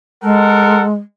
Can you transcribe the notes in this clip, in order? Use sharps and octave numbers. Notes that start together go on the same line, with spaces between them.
G#3 A4 A#4 F#5